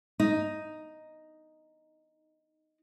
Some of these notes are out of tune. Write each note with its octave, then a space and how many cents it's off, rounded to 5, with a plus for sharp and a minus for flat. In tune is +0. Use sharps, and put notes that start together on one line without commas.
D#4 +0